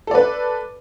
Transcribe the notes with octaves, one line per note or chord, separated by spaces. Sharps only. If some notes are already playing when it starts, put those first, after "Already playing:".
A4 B4 D5